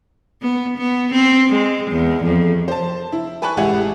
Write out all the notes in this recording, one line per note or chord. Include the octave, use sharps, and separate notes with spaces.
B3
B3
C4
G#3
E2
F2
C5 A5
E4
B4 G#5 A5 B5 C#6 F#6
A1 G#3 G4 E5 F#5 G#5